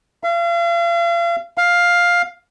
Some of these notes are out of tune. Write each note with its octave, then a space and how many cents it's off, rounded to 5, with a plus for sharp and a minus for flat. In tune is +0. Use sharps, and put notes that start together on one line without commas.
F5 -40
F5 +10